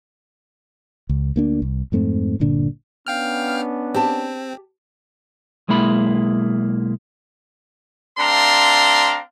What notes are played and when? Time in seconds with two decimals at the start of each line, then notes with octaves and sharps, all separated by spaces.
1.09 C#2
1.36 D2 A#3 D4
1.62 C2
1.92 F2 G#2 A3 C4
2.40 G1 A#2 D3 D4
3.07 B3 C#4 D4 F5 G5 F6
3.94 C4 G4 A5
5.68 B1 G#3 A#3 E4 B5
8.18 A3 C4 D4 F5 A#5 C6